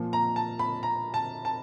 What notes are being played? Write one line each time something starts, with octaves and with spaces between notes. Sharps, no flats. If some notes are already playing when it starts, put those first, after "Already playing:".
Already playing: A#2 F3
A#5
A5
B5
A#5
A5
A5